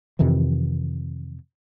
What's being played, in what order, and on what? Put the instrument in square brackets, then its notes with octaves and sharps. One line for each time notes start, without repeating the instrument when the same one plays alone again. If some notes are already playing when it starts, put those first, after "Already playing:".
[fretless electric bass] F2 C3 D#3 E3